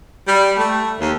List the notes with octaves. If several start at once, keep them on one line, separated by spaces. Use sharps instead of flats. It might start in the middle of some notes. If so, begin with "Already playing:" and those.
G3
A3
D#2